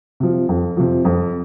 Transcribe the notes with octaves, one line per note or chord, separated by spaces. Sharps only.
C3 F3
F2
C3 F3
F2